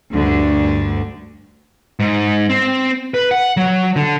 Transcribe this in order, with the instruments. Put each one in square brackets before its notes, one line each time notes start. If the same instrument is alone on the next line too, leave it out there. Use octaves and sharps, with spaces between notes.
[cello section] D2 G2 D3 D4
[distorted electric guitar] G#2
C4
B4
F#5
F#3
D3